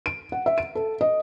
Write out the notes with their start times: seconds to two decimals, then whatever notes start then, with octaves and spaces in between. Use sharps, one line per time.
0.06 D7
0.32 F#5
0.46 E5
0.58 D7
0.75 A4
1.01 D#5